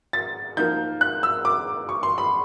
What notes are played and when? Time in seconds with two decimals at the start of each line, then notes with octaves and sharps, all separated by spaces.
0.13 A6
0.57 F3 A#3 D#4 G6
1.01 F#6
1.23 E6
1.45 D6
1.89 C#6
2.03 C6
2.18 B5